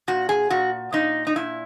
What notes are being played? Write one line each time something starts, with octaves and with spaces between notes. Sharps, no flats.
A#2 F#4
G#4
A#2 F#4
A#2 D#4
D#4
A#2 E4